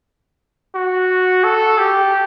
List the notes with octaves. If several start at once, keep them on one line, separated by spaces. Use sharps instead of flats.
F#4
A4
G4